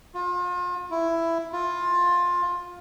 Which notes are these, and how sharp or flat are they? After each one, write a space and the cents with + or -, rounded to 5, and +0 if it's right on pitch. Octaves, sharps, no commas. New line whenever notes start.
F4 +35
E4 +10
F4 +15